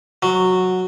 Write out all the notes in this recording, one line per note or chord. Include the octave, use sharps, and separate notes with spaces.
F#3